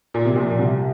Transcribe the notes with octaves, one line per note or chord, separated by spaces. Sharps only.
A#2
C3
A#1 A#2
A#2
C2 C3